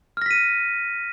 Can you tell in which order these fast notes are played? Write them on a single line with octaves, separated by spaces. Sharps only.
F6 A#6 B6 D#7